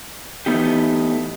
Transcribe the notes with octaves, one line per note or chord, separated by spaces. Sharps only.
E3 A3 B3 D#4 G4